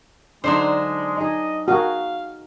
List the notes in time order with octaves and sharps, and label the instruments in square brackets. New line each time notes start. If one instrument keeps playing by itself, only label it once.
[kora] D3 D#4 [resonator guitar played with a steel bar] F#3 D4 C5 [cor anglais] G#3
[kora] D#4 G#4 [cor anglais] D#5
[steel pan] F#4 [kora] G#4 A#4 D#5 [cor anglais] F5